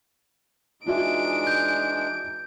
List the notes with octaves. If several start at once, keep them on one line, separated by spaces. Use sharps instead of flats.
E3 G#3 D4 D#4 F4 F#4 E5 D7
G6